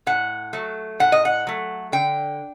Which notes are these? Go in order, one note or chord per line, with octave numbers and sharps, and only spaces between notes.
A2 F#5
F#3 A3
A2 F#5
D#5
F#5
F#3 A3
D3 G5